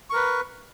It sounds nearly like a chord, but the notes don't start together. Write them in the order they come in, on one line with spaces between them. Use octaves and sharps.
C#6 A#4 B4